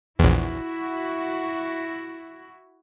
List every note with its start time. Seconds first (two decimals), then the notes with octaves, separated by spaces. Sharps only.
0.19 A#1 E2 E4 F#4